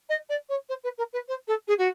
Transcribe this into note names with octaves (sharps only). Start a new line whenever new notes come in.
D#5
D5
C#5
C5
B4
A#4
B4
C5
A4
G#4
F#4